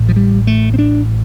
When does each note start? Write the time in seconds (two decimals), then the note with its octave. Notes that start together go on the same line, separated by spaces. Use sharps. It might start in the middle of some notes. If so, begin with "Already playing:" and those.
Already playing: A1 A2
0.09 F3
0.16 G3
0.47 A3
0.74 C4
0.79 D4